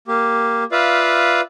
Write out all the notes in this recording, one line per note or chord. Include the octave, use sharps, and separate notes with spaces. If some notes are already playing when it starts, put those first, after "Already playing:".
A#3 G4
F4 B4 D5 E5 F5